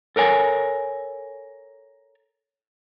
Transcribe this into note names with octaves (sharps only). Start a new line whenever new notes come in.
A4 A#4 C#5 G#5